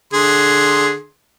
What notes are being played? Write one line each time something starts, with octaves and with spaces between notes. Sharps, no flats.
D3 G#4 C6